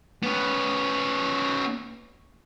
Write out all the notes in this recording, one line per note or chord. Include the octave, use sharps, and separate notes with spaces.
B3 C#4